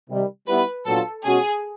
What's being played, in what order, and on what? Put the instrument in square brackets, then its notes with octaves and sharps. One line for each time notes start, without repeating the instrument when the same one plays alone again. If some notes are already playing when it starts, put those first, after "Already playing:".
[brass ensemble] C3 D#3 G3
[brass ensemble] G3 B3 E4 [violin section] B4
[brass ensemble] A#2 F#3 B3 D4 F4 [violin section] A4
[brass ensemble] B2 G#3 C#4 F#4 [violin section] G#4